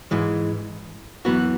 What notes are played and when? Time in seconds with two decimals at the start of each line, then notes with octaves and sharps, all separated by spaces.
0.11 G#2 E3 G#3
1.25 F#2 E3 B3 F#4